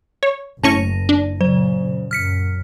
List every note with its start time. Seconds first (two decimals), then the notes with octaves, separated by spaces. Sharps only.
0.23 C#5
0.63 F#1 A2 C#4 A5 C#6 A#6 D#7
1.09 D4
1.41 A#2 C#3 F#3 C5
2.11 F#2 F6 B6 C#7